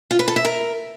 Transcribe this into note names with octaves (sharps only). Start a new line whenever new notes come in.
F4
B4
A4
E5
A#4